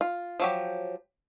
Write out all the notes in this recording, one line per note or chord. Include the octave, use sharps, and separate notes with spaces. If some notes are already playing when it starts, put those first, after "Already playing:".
F4
F3 F#3 G4